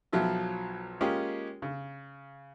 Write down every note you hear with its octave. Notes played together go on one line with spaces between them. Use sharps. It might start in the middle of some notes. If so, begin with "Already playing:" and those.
B1 F3 F#3 F4 E5
G#3 A#3 C#4 F4 G4 G#4
C#3